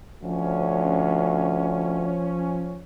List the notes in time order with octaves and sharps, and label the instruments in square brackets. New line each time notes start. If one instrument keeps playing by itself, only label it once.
[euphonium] D2 [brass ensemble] F3 C#4